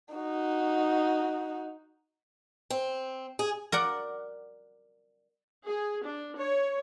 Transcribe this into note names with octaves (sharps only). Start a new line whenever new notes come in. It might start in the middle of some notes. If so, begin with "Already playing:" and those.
D#4 F#4
C4
G#4
A#4 D5 F#5
G#4
D4
C#5